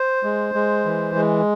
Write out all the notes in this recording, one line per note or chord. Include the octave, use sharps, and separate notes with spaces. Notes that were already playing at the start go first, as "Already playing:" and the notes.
Already playing: C5
G#3
G#3
E3
G#3